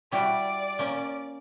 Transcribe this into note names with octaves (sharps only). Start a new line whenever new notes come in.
G3 E4 F#4 D5
A#3 C#4